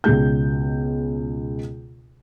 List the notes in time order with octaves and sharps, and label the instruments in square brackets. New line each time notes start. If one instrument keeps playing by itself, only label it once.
[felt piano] C#2 B2 G#3 G6